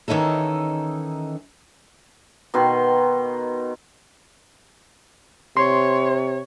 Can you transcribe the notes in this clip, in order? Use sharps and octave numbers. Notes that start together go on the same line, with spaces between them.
D#3 E3 C#4 D#4 A4
B2 D#3 C6
C3 C#5 C6